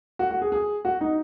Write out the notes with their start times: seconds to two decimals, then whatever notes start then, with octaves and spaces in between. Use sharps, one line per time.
0.19 F#4
0.31 F#4
0.42 G#4
0.52 G#4
0.85 F#4
1.01 D#4